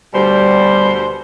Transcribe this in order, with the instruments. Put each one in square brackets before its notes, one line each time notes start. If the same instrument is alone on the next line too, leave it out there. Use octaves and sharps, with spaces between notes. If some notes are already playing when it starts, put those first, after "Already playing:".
[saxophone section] D2 B2 C5 [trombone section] G3